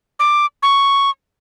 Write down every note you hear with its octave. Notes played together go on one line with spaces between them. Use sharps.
D6
C#6